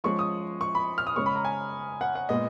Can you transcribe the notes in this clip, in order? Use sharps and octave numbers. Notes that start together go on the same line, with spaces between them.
F3 G#3 C#4 C#6
D#6
C#6
B5
F6
D#6
C#3 G#3 C#4 C#6
B5
A#5
G#5
F#5
F#5
A#2 G#3 B3 D#5